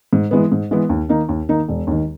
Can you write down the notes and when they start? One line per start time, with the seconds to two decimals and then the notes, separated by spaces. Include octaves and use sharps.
0.13 G#2
0.31 E3 G#3 B3
0.52 G#2
0.71 E3 G#3 B3
0.89 D#2
1.09 D#3 A#3 D#4
1.29 D#2
1.49 D#3 A#3 D#4
1.69 E1
1.87 D#2 D#3